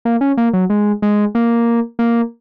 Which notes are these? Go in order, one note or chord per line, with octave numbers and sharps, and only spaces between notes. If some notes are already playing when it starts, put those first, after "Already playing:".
A#3
C#4
A#3
F#3
G#3
G#3
A#3
A#3